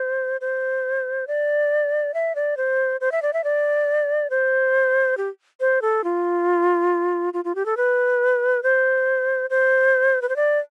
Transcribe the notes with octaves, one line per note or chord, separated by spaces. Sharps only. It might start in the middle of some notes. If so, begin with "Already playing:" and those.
Already playing: C5
C5
D5
E5
D5
C5
C5
E5
D5
E5
D5
C5
G4
C5
A4
F4
F4
F4
G4
A4
B4
C5
C5
B4
C5
D5